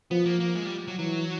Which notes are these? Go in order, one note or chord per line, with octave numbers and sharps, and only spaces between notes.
F3 B3
A#3
A#3
G#3
G3
F#3
E3 F#3